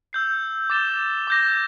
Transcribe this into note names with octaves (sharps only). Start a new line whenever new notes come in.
E6 G6 C7
D6 A6 E7 G7
D6 G6 A#6